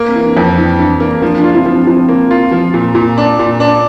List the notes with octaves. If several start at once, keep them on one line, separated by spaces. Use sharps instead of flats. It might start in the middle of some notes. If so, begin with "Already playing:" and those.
Already playing: A#3
C4
E3
D4
F2 C4
E3 D4
E3 D4
A#3 D4
F3 D4 F4
D4
F4
C4 E4
F3
C4
F3 C4 E4
A#3
F4
F3
A#2
A#2
D4
A#2
D4